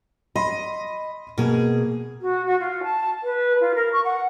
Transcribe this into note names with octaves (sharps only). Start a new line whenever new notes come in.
D#5 B5 C6
B2 A#3 G#4
F#4
F#4
F4
A5
B4
F4
A#4
C#6
F#5